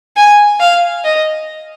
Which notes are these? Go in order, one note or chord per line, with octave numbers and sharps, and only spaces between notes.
G#5
F5
D#5